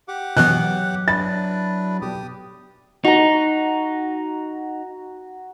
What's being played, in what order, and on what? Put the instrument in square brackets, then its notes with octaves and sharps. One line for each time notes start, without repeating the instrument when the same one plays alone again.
[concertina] G4 F#5 D6
[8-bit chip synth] B2 E3 B3 [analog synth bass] F#3 [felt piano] F#6
[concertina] D4 E4 B4 [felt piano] A6
[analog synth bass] B1 [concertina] G4 D#6
[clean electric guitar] D#4 [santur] F#4 A#5